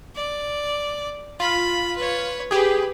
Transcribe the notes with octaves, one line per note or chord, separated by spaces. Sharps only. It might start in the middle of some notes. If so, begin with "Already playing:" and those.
D5
F4 B5
B4 C#5
G4 G#4 B4